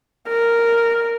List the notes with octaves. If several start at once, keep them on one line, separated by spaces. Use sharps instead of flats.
A#4